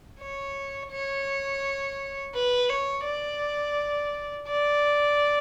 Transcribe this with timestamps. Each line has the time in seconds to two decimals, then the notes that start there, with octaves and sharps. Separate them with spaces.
0.19 C#5
0.91 C#5
2.34 B4
2.70 C#5
3.05 D5
4.48 D5